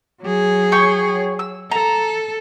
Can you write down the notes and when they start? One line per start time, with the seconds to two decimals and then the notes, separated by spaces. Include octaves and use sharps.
0.22 F#3 G#4
0.72 C#5 G5 C#6
1.39 E6
1.72 A4 A#5